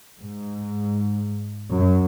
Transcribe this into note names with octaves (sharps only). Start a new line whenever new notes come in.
G#2
F#2